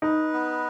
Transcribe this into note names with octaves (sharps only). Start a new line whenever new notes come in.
D#4 B4
B3